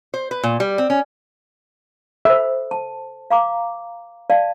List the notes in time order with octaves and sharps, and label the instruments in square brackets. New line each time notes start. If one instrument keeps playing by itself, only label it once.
[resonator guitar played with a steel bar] C5
B4
A#2
G3
C4
C#4
[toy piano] A4 C5 [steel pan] E5
[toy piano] A5
F5 A#5 D6
D5 F5 A5